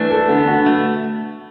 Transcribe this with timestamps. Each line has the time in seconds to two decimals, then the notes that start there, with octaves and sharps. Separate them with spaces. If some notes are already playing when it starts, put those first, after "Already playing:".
Already playing: E3 A3 D4
0.11 A4
0.29 D3 B3
0.47 F#4
0.66 A3